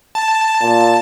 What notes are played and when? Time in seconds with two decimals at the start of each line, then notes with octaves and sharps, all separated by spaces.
0.15 A5
0.61 A#2